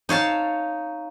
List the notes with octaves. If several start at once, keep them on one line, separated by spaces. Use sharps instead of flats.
D#4 C#5 F5 A5